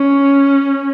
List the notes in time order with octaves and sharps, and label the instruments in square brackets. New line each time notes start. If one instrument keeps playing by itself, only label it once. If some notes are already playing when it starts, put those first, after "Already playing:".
Already playing: [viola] C#4